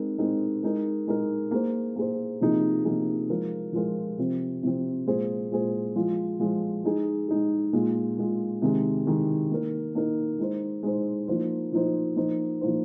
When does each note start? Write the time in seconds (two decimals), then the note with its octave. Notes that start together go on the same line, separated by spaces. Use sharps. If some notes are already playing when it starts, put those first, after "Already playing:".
Already playing: G#3 C4 D#4 A#4
0.18 G#3 C4 D#4 A#4
0.63 G#3 D#4 A#4
1.07 G#3 D#4 A#4
1.51 A#3 G#4 C5
1.96 A#3 G#4 C5
2.41 C3 F3 A#3 D#4 G#4
2.85 C3 F3 A#3 D#4 G#4
3.29 F3 G#3 F4 A#4
3.73 F3 G#3 F4 A#4
4.18 C3 F3 C4
4.63 C3 F3 C4
5.06 A#2 G#3 F4 G#4 C5
5.50 A#2 G#3 F4 G#4 C5
5.96 F3 G#3 F4
6.39 F3 G#3 F4
6.84 G#3 D#4 G#4
7.28 G#3 D#4 G#4
7.73 A#2 G#3 F4
8.17 A#2 G#3 F4
8.62 C3 D#3 G#3
9.06 C3 D#3 G#3
9.51 A#3 D#4 A#4
9.95 A#3 D#4 A#4
10.39 G#3 D#4 C5
10.83 G#3 D#4 C5
11.28 F3 A#3 D#4 C5
11.72 F3 A#3 D#4 C5
12.16 F3 A#3 D#4 C5
12.61 F3 A#3 D#4 C5